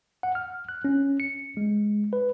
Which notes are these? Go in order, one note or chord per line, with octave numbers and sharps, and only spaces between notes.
F#5
F6
F#6
C#4
C#7
G#3
B4